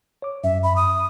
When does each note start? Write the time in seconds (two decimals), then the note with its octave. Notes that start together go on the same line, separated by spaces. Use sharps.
0.22 C#5 D6
0.44 F#2 E5
0.63 B5
0.76 D#6